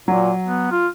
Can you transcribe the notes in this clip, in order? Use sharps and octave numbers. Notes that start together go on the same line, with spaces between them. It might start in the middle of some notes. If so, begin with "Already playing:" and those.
A#2 F#3
B3
F4